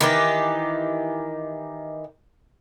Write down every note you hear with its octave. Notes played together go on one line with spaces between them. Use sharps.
D#3 E3 G4